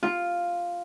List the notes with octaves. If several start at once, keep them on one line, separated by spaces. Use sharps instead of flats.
F4